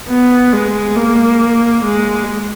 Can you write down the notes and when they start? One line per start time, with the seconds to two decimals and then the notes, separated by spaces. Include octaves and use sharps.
0.08 B3
0.53 G#3
0.96 A#3
1.84 G#3